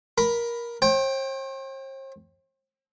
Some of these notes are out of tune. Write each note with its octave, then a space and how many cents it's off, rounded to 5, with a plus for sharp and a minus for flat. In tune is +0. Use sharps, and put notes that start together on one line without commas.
A#4 +15 B5 +0
C5 +45 G5 +0